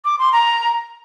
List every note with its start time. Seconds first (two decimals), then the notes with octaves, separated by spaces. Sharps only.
0.05 D6
0.19 C6
0.32 A#5